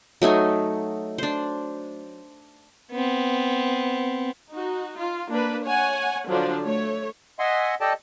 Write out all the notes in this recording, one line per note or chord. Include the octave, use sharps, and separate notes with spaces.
F#3 A3 D#4 G#5
D4 C5
B3 C4
D#4 F#4
F4
A#3 D4 B4
C#5 F#5 G#5
D3 F3 F#3 D4
A3 C#5
D#5 E5 F#5 G#5 C6
G4 A4 D5 D#5 G5 A5